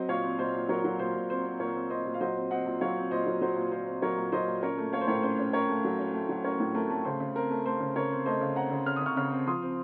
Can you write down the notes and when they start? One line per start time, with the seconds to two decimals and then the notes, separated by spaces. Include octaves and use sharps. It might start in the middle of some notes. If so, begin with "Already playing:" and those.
Already playing: F#3 C4 C5 D#5
0.09 A#2 C#5 F5
0.24 C4
0.39 A#2 C5 D#5
0.54 A#2
0.69 F#3 A#4 C#5
0.85 F#3
0.99 A#2 C5
1.14 A#2
1.30 C4 C5
1.45 C4
1.59 A#2 A#4 C#5
1.75 C4
1.90 C4 C5 D#5
2.06 A#2
2.14 F5
2.21 F#3 C5 D#5
2.36 C4
2.51 C4 D#5 F#5
2.66 A#2
2.81 F#3 C#5 F5
2.96 C4
3.11 A#2 C5 D#5
3.27 F#3
3.41 F#3 C5
3.57 A#2
3.72 A#2 C5
3.87 C4
4.02 F#3 A#4 C#5
4.18 A#2
4.32 F#3 C5 D#5
4.48 A#2
4.63 C#4 A#4 C#5
4.78 A3
4.93 A3 C#5 F5
5.01 C5
5.08 A2 A#4 C#5
5.23 C#4 C5
5.39 C#4
5.53 C#4 A#4 C#5
5.69 A3
5.84 F#3
5.99 C#4
6.14 A3
6.29 F#3
6.44 C#4 A#4 C#5
6.60 A2
6.75 A3 A#4
6.90 A3
7.05 C#3 C5
7.20 C#3
7.35 C4 A#4
7.50 A3
7.66 A3 C5
7.80 C#3
7.96 C#3 A#4 C#5
8.11 C4
8.26 A3 C5 D#5
8.41 C#3
8.56 C4 F#5 A#5
8.71 C#3
8.86 C#3 F6
8.96 D#6
9.01 C#3 C#6 F6
9.16 C#3 C#6 F6
9.32 C4
9.47 F3 C6 D#6
9.62 C4